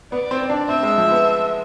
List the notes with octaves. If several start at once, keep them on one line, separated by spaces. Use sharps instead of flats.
B3 D5
C4
D4
C4 E5
G#3
F3
B3